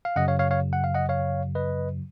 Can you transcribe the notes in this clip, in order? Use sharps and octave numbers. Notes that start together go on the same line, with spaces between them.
F5
F#2 C#3 F#3 D#5 F#5
C#5 F5
C#5 F5
C#5 F5
F#5
F5
D#5 F#5
C#5 F5
B4 D#5